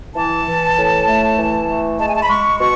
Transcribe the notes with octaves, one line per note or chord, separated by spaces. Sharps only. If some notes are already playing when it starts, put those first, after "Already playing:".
E3 A5
E3
A2
A3
E3
A3
G#3 A5
G#5
A5
B5
G#3 C#6
B2 C#6